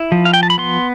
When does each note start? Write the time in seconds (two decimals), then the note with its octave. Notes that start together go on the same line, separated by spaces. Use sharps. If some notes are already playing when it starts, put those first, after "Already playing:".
Already playing: E4
0.12 F3
0.25 F5
0.34 G5
0.43 A5
0.50 B5
0.58 B3 C6